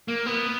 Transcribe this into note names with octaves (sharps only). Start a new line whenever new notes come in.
A#3
B3